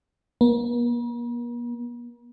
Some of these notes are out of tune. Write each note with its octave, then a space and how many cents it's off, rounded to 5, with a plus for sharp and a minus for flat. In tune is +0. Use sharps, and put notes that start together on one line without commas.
A#3 +45